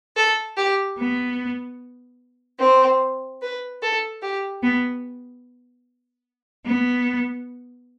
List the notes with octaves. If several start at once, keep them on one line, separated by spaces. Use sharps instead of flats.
A4
G4
B3
C4
B4
A4
G4
B3
B3